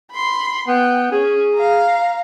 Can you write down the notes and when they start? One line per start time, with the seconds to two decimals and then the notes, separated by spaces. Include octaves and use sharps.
0.12 B5 C6
0.68 B3 G5
1.12 C#4 G#4
1.55 F5 A#5